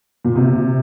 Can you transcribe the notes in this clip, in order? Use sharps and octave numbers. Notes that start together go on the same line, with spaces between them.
A#2
C3